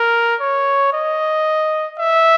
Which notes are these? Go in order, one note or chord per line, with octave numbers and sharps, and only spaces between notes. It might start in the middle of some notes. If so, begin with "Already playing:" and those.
Already playing: A#4
C#5
D#5
E5